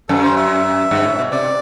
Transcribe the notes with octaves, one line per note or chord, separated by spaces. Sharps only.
F#2 A4
C5
E5
G2
A2
B2
C3 D5